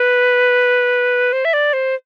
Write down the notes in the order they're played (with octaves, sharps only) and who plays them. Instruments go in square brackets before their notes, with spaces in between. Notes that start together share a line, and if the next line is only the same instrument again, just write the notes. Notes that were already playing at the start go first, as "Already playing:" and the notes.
Already playing: [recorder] B4
C5
E5
D5
C5